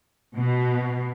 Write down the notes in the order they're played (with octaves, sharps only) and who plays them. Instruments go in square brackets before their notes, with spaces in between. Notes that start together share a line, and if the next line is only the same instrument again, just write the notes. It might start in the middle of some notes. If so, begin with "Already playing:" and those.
[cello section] B2